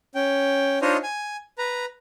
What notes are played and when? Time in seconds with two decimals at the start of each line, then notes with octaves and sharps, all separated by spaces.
0.15 C#4 G5
0.82 D4 D#4 F4 C5 C#5 D#5
1.03 G#5
1.58 B4 A#5